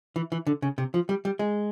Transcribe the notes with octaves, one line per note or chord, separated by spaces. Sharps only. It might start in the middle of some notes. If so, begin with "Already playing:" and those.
E3
E3
D3
C#3
C3
F3
G3
G3
G#3